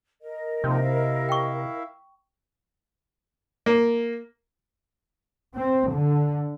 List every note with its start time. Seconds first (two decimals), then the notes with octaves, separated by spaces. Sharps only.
0.22 A#4 D#5
0.64 C3 F3 A#3 D#4
0.82 E4 E5 F5
1.29 G5 C#6
3.66 A#3
5.57 C4
5.92 D3